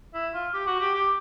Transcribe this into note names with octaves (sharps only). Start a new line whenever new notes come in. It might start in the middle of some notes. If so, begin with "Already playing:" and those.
E4
F4
G4
F#4
G4
G4